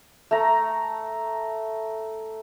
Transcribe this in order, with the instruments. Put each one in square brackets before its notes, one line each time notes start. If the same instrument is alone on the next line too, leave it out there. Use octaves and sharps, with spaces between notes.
[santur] A3 A#5